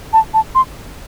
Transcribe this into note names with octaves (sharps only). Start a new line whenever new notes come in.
A5
A5
C6